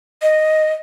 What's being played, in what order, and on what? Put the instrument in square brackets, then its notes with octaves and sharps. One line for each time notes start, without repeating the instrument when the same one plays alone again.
[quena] D#5